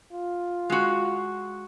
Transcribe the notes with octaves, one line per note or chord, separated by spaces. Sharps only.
F4
G#3 F#4